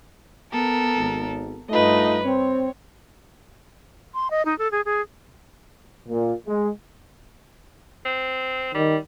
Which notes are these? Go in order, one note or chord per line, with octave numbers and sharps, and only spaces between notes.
B3 A4 A#4
G#1
G2 A3 D#4 F4 B4 D#5
C4 C#5
C6
D#5
D#4
A4
G#4
G#4
A#2
G#3
C4
D#3 G3